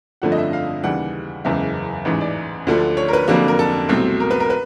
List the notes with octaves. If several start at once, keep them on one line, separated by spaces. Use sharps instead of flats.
G1 F2 D3 F3 A3 F#5
D#5
E5
F5
D#2 C#3 E3 G3 F#5
F#1 E2 C#3 E3 G#3 E5
A1 G#2 E3
D5
D2 D3 F3 A3
C#5
A#4
B4
F1 F2 D3 F#3 A#3
A#4
A4
C2 B2 F#3 A3 C4
A#4
B4
A#4
B4